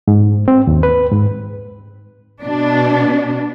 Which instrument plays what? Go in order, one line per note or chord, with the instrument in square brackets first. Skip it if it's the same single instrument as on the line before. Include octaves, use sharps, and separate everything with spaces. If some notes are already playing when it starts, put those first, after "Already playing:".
[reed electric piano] G#2
C4
D#2
B4
G#2
[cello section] B2 D4